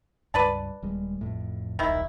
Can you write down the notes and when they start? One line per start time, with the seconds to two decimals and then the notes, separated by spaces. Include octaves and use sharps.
0.34 C#2 G2 B4 D5 A5
0.83 D#1 G3 G#3
1.21 A1 F2 A2
1.79 D#1 B1 D#3 E4